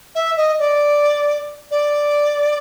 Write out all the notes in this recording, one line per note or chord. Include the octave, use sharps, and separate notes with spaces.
E5
D#5
D5
D5